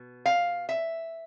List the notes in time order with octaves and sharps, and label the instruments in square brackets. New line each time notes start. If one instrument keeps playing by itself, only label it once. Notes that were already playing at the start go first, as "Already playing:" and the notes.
Already playing: [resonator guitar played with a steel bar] B2
F5
E5